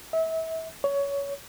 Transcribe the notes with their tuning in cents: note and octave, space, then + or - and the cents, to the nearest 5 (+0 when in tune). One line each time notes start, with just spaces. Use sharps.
E5 -35
C#5 +20